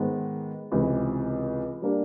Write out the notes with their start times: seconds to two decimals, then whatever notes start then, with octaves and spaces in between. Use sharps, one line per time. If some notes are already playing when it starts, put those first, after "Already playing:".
Already playing: G#2 D#3 G#3 B3
0.72 C#2 C3 E3
1.82 G3 A#3 D4